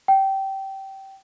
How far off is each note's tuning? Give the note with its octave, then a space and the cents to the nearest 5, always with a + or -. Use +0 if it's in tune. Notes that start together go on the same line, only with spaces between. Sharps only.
G5 -20